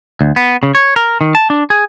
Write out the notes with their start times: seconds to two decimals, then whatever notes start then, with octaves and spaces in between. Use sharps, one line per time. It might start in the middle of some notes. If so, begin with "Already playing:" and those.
0.21 D2
0.36 B3
0.63 C#3
0.75 C#5
0.96 A#4
1.21 D#3
1.35 A5
1.50 D4
1.70 G#4